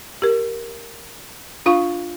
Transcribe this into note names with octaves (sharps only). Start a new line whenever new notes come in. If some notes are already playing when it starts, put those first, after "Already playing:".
G4 A#4
D4 F4 F5 C#6